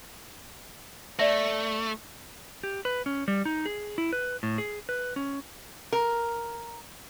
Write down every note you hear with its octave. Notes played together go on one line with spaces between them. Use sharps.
A3 D5 E5 A#6
G4
B4
C#4
G3
D#4
G#4
E4
B4
A2
G#4
B4
C#4
A#4